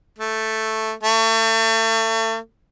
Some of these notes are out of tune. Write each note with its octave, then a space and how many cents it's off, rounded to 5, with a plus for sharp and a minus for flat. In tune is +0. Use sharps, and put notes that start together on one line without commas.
A3 +0
A3 +35